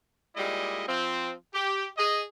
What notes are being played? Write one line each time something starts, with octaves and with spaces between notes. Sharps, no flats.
A#2 G3 G#3 E4 D#5
F3 C4
G4
G#4 D#5